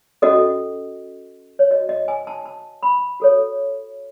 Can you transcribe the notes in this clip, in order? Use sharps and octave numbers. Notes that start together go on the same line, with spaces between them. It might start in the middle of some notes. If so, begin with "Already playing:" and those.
C#4 F#4 A4 D#5
C#5
F#4 C#5 D#5
D#5
G#5
A5
A5
B5
F#4 A4 C#5